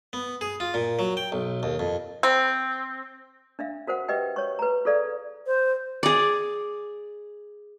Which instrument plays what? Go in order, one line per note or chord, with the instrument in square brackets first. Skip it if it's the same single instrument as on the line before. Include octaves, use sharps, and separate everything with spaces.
[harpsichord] B3
G#4
F4
A#2
F#3
G5
B1
D#2
F2
[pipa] C4
[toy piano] D4 E5 F5
F#4 A#4 C5 F#5
G4 B4 D#5 E5 G5
C#5 C#6
B4 A#5
F4 G#4 A4 D5 F5
[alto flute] C5
[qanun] G#4 D5